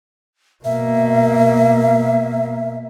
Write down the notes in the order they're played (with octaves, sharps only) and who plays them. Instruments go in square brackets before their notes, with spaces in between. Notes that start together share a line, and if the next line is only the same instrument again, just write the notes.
[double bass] B2 A#3 [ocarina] E5